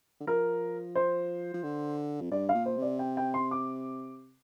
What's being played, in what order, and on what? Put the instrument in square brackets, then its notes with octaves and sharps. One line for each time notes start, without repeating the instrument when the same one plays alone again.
[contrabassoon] D3
[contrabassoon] F3 [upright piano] A#4
[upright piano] C5
[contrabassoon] F3
D3
F2
[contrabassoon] G2 [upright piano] D5
[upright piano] F5
[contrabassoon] A#2
[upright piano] C5
[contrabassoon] C3
[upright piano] D5
G5
G5
C6
D6